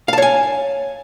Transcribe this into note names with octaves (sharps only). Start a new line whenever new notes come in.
C#5 F5 G#5 A5